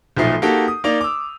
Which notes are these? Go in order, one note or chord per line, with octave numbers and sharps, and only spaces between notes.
B1 A#2 F3 A3 D#4 C7
A#3 D#4 F#4 G4 A4
D#6
A#3 D#4 D5 F7
D6 E6